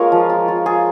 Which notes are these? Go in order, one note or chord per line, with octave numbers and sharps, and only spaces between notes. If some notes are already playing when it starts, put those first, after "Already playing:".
Already playing: G#3 A#3 F4 A#4 C#5 F5 G#5
F3
F4
F4
F4 G#4